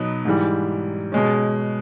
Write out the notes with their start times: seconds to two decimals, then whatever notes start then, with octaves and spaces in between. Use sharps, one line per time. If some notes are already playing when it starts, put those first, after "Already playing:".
Already playing: B2 F#3 B3 D#4
0.25 G#2 E3 G3
1.12 B2 G#3 C#4